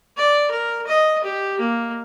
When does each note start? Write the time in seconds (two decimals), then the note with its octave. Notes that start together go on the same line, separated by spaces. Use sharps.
0.17 D5
0.51 A#4
0.87 D#5
1.24 G4
1.60 A#3